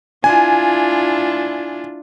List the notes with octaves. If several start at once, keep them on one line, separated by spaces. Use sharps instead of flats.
D4 E4 F4 G#5